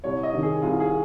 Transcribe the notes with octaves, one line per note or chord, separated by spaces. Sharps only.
C2 C#5
D#5
C3 D#3
G#4
C2 F4
G#4